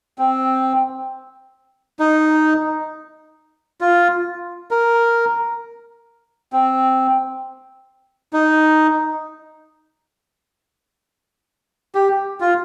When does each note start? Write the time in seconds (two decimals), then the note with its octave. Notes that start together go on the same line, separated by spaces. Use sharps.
0.18 C4
1.99 D#4
3.81 F4
4.71 A#4
6.53 C4
8.33 D#4
11.95 G4
12.40 F4